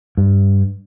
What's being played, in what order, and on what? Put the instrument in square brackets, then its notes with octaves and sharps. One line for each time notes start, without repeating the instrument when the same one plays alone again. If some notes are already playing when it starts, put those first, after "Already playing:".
[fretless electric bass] G2